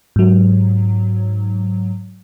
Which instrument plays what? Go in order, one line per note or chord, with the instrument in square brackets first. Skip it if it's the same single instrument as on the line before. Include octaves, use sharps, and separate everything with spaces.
[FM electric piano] G#2 F#3